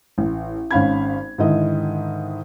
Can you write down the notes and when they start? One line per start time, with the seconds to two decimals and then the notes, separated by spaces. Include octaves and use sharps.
0.18 A1
0.71 G#1 C#4 F5 B5 G#6
1.38 G#2 D3 D#3 E4 D#5